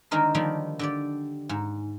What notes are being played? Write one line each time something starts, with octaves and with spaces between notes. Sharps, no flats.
D3 D#3 G#3 D#4 A#4 C5
D3 D#3 F3 G3 A#3 D4
D3 G4 D5
G#2